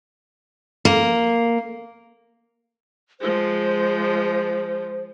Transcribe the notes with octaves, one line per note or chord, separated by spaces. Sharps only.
A#3
F3 G#3 C5